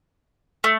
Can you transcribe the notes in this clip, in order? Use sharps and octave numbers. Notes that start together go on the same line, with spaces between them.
A3